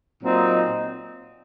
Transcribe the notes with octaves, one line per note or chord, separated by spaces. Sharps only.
A#2 F#3 C4 D#4